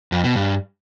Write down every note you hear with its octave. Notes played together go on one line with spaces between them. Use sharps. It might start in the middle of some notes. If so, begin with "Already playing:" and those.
F2
B2
G2